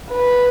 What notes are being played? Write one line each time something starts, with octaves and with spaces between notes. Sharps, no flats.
B4